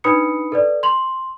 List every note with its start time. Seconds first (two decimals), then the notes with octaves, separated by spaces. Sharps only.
0.04 D4 D#4 B4 B5 D#6 C#7
0.52 A4 B4 D5
0.83 C6 F7 F#7